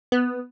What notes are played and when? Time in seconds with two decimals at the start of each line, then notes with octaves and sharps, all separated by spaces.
0.12 B3